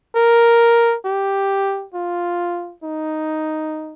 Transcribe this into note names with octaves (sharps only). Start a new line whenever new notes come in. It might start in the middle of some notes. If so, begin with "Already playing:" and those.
A#4
G4
F4
D#4